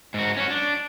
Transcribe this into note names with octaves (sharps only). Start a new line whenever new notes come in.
G#2 F#4
C#4 F#4
D4